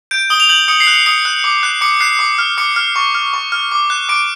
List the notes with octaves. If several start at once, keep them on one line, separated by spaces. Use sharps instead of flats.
G6 D7
D#6 G7
F7
G6 F#7
D#6 C#7
C7
F#6
C#7
D#6 C#7
F#6
D6
F#6
D6 C#7
F#6 C7
D6
F6
D6 C#7
F6
C#6
F6
C#6
F6
D6
F#6
D6 D7